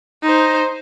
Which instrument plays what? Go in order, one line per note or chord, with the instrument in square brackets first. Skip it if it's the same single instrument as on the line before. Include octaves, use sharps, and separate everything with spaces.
[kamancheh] D#4 C5